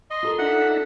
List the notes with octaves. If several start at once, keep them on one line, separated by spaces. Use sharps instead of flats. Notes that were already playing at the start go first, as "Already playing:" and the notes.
D#5 C6
F4 A4 A#4
D4 D#4 E5 F#5